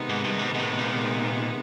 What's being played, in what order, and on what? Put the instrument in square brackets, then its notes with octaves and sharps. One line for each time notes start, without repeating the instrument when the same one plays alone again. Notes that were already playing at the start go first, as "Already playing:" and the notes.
Already playing: [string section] C3 D#3 G#3 B3 D#4
[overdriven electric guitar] G#2
G2
G#2
G#2
A2
A#2